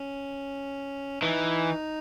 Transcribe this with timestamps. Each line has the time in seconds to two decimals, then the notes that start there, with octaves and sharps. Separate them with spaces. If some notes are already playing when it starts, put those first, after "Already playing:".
Already playing: C#4
1.22 E3 D#4